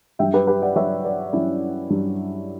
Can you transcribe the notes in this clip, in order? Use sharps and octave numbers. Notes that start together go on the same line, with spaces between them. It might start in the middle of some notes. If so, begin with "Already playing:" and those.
G2 F#3 E5 G5
G4 B4
G4 B4
D5 F#5
G2 F#3 C#5 E5
B4 D5
G2 F#3 C#4 E4
G2 F#3